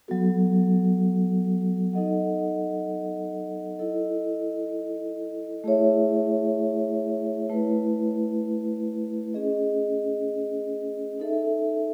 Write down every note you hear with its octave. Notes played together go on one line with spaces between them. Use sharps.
F#3 B3 F#4 A4
D#4 A4 D#5 F#5
E4 A4 D#5
A3 E4 G#4 C#5 E5
A3 E4 B4
C#4 G#4 D#5
D#4 A4 E5